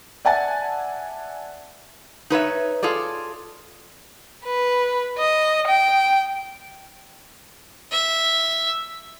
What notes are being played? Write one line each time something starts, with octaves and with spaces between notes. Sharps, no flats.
D5 E5 F#5 G#5 A5 A6
D#4 B4 C#5 E5
F4 G#4 A4 D5
B4
D#5
G5
E5